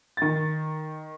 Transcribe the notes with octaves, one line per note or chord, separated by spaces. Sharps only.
D#3 A6